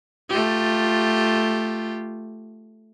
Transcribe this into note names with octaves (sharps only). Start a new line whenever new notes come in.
A3 F4 G4